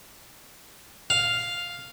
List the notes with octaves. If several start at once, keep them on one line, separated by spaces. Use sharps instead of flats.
F5